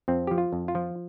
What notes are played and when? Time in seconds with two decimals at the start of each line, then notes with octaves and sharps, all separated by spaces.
0.08 F2 C4
0.27 F3 G4
0.38 F4
0.53 F2
0.68 F4
0.75 F3